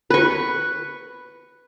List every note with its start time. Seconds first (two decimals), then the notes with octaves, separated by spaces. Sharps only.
0.10 B4 C#6